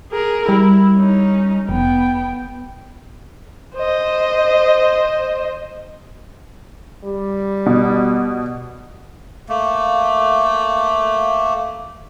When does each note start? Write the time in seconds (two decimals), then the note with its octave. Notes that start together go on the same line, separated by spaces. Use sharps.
0.12 G#4 A#4
0.49 G3 E4
0.96 C#4 D#4
1.69 F1 B3 G5
3.75 C5 D#5
7.04 G3
7.66 B2
9.49 A3 A#3